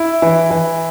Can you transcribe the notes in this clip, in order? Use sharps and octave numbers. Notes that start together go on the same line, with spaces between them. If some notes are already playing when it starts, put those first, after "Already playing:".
Already playing: E4
E3
E3